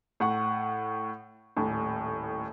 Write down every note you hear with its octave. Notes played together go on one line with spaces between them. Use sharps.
A2 F#5 C#6
D#1 A2